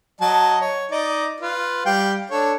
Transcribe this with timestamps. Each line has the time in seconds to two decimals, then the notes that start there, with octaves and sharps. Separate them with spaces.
0.21 F#3 D#5 A5
0.61 C#5
0.91 D#4 D5 D#5
1.40 F4 B4
1.86 G3 F5 G5
2.30 D4 A4 C#5